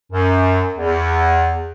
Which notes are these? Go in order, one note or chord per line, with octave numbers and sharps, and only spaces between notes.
F#2
E2